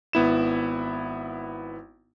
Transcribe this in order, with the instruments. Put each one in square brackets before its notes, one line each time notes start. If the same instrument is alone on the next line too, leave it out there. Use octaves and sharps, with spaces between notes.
[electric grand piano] G#1 B3 E4 E7